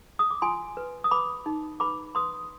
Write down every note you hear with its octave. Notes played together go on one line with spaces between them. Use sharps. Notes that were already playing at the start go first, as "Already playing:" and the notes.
D#6
D6
F4 G#5 C6
B4
D#6
B4 B5 D6
D#4
B4 B5 D6
B4 C6 D#6